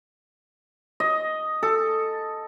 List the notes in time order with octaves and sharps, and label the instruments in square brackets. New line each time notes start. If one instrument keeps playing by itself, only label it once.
[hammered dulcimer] D#5
A4